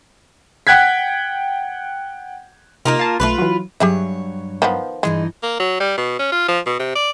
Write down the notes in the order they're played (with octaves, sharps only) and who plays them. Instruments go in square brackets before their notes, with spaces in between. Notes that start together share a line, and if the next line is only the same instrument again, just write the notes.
[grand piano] F#5 G5 F#6 G#6 B6
[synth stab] C3 D#4 [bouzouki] A#3 F4 A#4
[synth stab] F5 A5
[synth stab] B1 A3 [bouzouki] F4 G4 B4
[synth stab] E3 F#3
[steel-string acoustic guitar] G2 F#3 C#5 [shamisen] G4 G#4 E5
[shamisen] D#3 F3 B3
[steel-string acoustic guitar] G2 E3 D#4 [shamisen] G#3
[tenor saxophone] A#3
F#3
G3
B2
C#4
F4
F3
B2
C3
D5